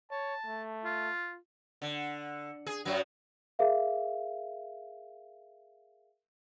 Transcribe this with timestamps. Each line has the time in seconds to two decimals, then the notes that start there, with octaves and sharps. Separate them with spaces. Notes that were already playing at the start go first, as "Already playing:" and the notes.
0.11 C#5 A5
0.46 A3
0.84 F4
1.82 D3
2.66 G#4
2.85 F#2 F#3
3.59 G#4 A#4 E5 F5